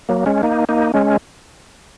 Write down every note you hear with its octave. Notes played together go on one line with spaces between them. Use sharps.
F#3 A#3
G#3 C#4
A#3 D#4
A#3 D#4
G#3 C#4